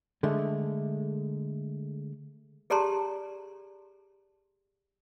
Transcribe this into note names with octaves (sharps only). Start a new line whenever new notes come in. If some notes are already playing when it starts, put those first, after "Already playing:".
D3 G#3 A3
G4 G#4 D5 A5 A#5 C6